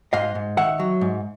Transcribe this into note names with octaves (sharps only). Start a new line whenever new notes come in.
G#2 D#5 F5
G#2
D#3 E5 F#5
F#3
G#2